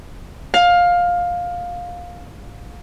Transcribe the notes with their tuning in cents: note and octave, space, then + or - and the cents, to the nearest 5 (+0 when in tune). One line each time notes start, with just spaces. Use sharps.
F5 +15